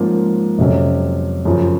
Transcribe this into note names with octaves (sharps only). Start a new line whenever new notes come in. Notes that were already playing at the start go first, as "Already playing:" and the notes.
Already playing: G#2 F3 A#3 C#4
F2 C3 F#3 C#4
F#2 C#3 F3